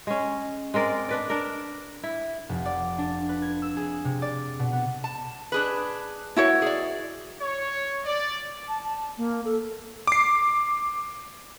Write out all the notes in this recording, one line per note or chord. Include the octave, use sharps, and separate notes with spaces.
G#3 C#4
G#3 C4 A#4 D5
D4 B4 D5
D4 A#4
E4
F1
D5
D4
B4
G#6
E6
G#4
C3
D5
B2
B3
A5
D4 G#4 B4
E4 F#4 C#5
G#4 D5
C#5
D5
A5
A5
A#3
A4
D6 C7